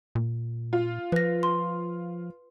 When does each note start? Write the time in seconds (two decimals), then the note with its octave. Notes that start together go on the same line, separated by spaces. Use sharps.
0.15 A#2
0.73 F4
1.12 F3 B4 A#6
1.43 C6